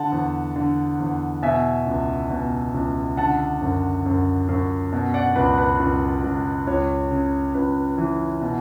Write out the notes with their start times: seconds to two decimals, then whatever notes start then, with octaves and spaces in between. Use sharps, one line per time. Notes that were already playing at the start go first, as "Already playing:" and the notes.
Already playing: D3 F#5 A5
0.12 E2
0.56 D3
0.99 E2
1.43 B2 E5 G#5
1.87 C#2
2.30 B2
2.74 C#2
3.17 D3 F#5 A5
3.61 F#2
4.06 F#2
4.48 F#2
4.92 B2
5.14 D5 F#5
5.36 C#2 B4
5.58 B4
5.80 C#2
6.24 C#2
6.67 C#2 C#5
7.11 C#3
7.54 C#2 B4
7.98 E3
8.41 B2